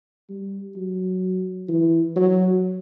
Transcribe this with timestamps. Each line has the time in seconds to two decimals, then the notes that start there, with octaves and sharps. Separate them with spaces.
0.30 G3
0.76 F#3
1.69 E3
2.16 F#3